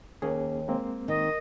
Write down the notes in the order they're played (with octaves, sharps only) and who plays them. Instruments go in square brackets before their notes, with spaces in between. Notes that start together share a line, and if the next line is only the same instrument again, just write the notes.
[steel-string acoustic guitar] D#2 [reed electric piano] A#3 C#4 G#4
[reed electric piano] G#3 A#3 C4
[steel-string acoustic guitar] D#3 [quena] D#5